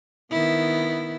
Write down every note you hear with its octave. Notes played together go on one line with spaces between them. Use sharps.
D#3 B3 E4